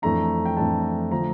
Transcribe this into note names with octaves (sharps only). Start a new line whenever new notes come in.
F2 E3 A3 D4 A#5
G5
F2 E3 A3 D4 A5
D3 F3 A3 A#5